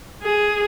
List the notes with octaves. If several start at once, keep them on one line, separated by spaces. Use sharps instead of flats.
G#4